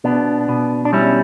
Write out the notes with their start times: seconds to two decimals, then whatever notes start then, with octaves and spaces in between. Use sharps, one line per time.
0.04 B2 B3 D4
0.49 B2
0.85 D4
0.93 G3 C#4 E4